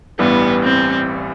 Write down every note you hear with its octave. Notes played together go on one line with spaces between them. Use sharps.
A1 G2 E3 G3 B3
C4